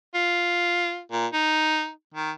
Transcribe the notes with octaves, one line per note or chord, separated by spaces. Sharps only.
F4
A#2
D#4
D#3